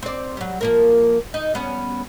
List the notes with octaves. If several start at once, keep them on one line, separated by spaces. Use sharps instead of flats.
C4 D5
F#3 G3
F3 A#3 A#4
D#4
G3 B3 C#4